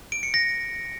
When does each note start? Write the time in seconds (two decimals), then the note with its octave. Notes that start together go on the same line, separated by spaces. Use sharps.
0.12 D7
0.23 C#7
0.34 A#6